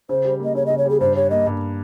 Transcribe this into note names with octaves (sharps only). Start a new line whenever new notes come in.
C#3 C5
G3
A#3 D#5
C#3 C#5
C#3 D#5
C#5
G3 G#4
G2 C5
G3 C#5
A#3 D#5
G2